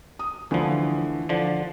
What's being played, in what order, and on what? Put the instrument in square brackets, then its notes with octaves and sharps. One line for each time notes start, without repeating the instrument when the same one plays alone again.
[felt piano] D#6
[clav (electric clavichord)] D2 F3 [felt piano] D3 E3
[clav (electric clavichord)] D3 F3 [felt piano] D5